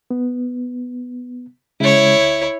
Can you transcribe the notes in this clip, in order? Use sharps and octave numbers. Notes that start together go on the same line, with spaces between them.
B3
C#3 G#3 E4 C#5
D2